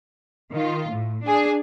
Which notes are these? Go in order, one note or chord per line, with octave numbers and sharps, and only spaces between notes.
D#3 F4
A2
D4 G#4